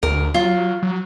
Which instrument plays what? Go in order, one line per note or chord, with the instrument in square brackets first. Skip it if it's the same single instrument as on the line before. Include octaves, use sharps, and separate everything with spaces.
[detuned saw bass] D2 [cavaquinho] A#4
[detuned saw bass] F#3 [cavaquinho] F4
[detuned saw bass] F#3